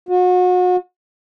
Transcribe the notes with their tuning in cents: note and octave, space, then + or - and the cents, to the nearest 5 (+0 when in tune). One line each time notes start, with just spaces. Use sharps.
F#4 -35